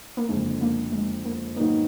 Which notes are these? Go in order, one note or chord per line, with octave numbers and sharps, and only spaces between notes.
A#3
F#1 F2 D3 G#3
A#3
G#3
A#3
G#2 D#3 F#3 A#3 B3 D#4